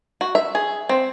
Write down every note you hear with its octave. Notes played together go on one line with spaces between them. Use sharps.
F#4
E5
G#4
C4